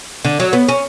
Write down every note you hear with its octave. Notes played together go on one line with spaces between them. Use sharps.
D3
F#3
B3
C#4